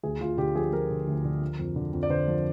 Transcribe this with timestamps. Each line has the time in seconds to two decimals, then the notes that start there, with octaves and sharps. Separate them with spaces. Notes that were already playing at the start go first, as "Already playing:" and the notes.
0.03 D2 G#4
0.21 D2 F4
0.37 D3 G4
0.55 F3 G#4
0.72 F3 A#4
0.90 D3
1.07 D2
1.25 D3
1.41 F3
1.59 F2
1.76 D3
1.93 F2
2.03 D5
2.10 D3 C5
2.27 F3